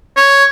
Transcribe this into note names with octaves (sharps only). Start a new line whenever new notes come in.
C#5